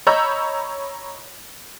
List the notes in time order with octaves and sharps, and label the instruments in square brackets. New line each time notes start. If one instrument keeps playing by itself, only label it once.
[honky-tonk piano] C#5 D#5 A#5 B5 E6 G6